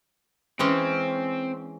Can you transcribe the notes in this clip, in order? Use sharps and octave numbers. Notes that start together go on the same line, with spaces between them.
E3 G#3 C4 C#4